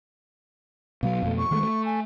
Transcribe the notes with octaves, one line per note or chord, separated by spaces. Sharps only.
B2 F#3 B3 F5
F2 B2 A3
C#6
D#3 G#3 A3
A3
G#5